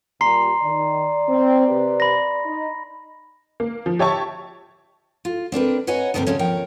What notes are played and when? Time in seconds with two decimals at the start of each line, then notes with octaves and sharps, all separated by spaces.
0.21 A#2 G3 A#5 C6 C7
0.63 D#3 D5
1.29 C4
1.68 C3 G4 B4
2.00 B5 A#6
2.46 D#4
3.60 A#3
3.86 F3
3.99 G4 C#5 E5 A5 C#6
5.25 F4
5.52 C4 D4 A#4 B4
5.87 B4 C#5 D#5 F#5 G#5 A#5
6.14 D2 G2 C3 G3 G4 A#4
6.27 D2 C#3 A3 C#4
6.39 D#2 F3 A#4 C#5 G5